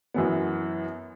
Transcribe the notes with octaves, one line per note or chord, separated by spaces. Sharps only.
F#2 E3 B3